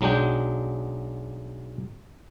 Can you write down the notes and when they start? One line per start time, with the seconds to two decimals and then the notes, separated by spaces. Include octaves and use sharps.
0.01 B1 F#3 G#3 D4 G5